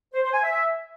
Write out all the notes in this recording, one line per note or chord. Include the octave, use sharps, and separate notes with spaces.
C5
C5
G#5
E5